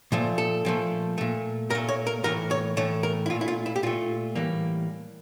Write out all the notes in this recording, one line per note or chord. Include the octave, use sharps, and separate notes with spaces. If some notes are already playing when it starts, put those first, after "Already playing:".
A#2 F3 A3
A4
A#2 F3 A3
A#2 A3
A#2 A3 A#4
C#5
A#4
A2 E3 A3 A#4
C#5
A2 E3 A3 C#5
A#4
E4
A#2 A3 F4
E4
F4
E4
G4
A#2 A3 F4
A2 E3 G3 A#3